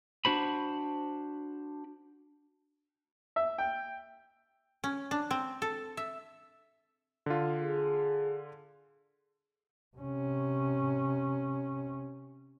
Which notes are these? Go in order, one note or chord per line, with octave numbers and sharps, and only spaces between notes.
D4 F#4 C5 B5
E5
G5
C#4
D4
C4
A4
E5
D3 F4
G#4
C3 C#4